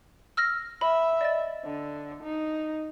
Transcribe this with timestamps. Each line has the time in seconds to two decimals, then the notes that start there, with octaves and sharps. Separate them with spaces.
0.37 E6 F6 A#6
0.81 E5 B5
1.21 D5 D#5 A6
1.65 D3
2.23 D#4